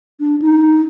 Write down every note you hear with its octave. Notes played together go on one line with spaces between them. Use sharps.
D4
D#4